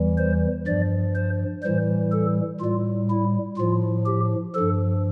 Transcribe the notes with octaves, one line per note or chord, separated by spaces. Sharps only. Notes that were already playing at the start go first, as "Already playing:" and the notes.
Already playing: E2 E3 G3
C5
G2 F3 D5
C5
A2 E3 G3 C5
A4
A2 G3 F4
E4
A2 F3 F4
G4
G2 F3 A4